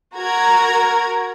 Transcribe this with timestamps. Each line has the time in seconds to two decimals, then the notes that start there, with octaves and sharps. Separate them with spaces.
0.16 F#4 A#4 A#5 G#6